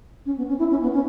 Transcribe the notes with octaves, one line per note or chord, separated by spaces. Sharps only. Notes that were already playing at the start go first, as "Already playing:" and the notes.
C#4
B3
C#4
E4
C#4
B3
C#4